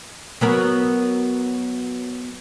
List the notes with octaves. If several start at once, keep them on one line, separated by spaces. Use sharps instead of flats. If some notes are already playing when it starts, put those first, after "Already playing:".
F#3 B3 A#4